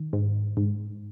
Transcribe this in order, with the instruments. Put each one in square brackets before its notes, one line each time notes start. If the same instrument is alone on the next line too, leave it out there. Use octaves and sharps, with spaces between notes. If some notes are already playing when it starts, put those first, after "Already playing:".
Already playing: [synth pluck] D#3
G#2
G#2